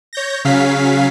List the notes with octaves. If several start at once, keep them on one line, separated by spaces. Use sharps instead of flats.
C#5 G6 A#6
C#3 F#3 C#4 F5 B6